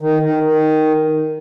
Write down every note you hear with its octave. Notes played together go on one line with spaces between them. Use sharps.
D#3
D#3
D#3